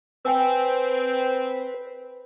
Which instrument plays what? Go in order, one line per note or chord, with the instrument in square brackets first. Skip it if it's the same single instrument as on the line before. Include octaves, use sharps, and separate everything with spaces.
[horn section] C4 [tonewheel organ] B4 [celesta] G5 G#5 E6